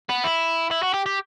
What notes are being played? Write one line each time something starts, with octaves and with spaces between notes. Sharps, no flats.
B3
E4
E4
F#4
G4
G4